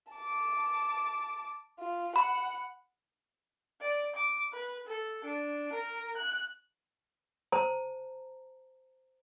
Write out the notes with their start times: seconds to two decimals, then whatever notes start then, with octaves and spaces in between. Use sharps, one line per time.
0.13 A5 D6
1.79 F4
2.16 F#5 B5
3.81 D5
4.16 D6
4.53 B4
4.87 A4
5.25 D4
5.73 A#4
6.17 F#6
7.52 C5 A5 A#5